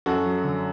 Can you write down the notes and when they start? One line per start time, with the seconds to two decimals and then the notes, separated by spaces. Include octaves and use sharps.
0.06 F#2 F#4 A4
0.26 F#3
0.44 D3